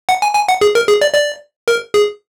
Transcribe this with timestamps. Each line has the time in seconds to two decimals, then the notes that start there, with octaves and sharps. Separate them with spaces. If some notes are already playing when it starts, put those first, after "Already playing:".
0.09 F#5
0.22 G#5
0.35 G#5
0.49 F#5
0.61 G#4
0.75 A#4
0.88 G#4
1.01 D5
1.14 D5
1.68 A#4
1.94 G#4